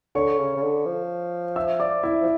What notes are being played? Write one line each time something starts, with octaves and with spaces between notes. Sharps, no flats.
D3 C#5 C#6
C#3
C#3
D3
F3
E5 E6
D5 D6
E4 E5
F3